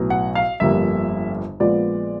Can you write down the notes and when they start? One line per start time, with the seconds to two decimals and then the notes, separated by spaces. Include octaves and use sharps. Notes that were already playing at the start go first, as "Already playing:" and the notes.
Already playing: B1 A2 F#3 B3
0.10 F#5
0.35 F5
0.60 G1 F2 D3 G3 A#3 E5
1.60 A#1 A#2 F3 G#3 B3 D5